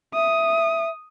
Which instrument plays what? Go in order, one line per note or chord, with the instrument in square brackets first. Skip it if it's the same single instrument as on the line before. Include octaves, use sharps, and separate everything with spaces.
[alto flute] E5 [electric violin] D#6